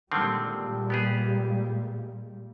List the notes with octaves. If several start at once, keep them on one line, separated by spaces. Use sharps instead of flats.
A#2 D3 D#3 G3 G#3 C4
B3 G4 G#4